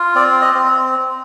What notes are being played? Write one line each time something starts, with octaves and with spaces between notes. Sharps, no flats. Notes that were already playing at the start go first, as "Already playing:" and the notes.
Already playing: F4
C4 D5
D#5
C4